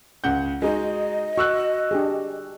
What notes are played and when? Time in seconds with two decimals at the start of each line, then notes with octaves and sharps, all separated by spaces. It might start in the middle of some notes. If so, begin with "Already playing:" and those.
0.24 C#2 F#5 G6
0.62 G#3 D#4 F#4 D#5
1.38 F#4 C#6 E6 F#6
1.91 D4 G4 G#4